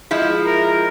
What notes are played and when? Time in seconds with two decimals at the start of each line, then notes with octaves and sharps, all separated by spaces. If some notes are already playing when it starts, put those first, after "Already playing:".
0.11 F3 G#3 E4
0.45 A#4